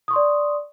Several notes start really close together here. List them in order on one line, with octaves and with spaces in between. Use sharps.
D#6 C#6 C6 D5